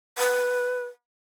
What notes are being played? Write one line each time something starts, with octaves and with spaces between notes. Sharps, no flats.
B4